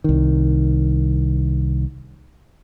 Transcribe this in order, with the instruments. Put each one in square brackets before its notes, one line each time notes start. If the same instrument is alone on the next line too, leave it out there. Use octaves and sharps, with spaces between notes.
[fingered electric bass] C2 D#3